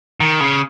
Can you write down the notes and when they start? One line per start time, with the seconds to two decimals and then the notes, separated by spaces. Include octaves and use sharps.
0.20 D#3
0.40 C#3